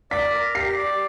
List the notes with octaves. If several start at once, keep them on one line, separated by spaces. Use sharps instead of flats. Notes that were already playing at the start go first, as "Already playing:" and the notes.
D5 B6
A#4
G4 C7
D5